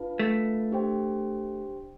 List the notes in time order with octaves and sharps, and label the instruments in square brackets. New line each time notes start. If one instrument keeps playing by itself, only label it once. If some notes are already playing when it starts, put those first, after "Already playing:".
Already playing: [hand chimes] D4 F4 B4 F5 A5
[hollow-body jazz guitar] A3
[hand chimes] D4 G4 C5 G5